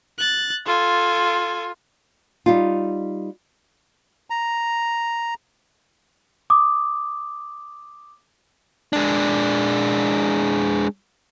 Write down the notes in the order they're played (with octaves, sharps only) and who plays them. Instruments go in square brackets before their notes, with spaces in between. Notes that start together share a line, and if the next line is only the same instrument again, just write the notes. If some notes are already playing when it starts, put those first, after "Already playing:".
[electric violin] F#6 A6
[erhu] F4 [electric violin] A4 G#5
[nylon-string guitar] G3 D#4 F4
[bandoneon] A#5
[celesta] D6 D#6
[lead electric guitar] G#3 D4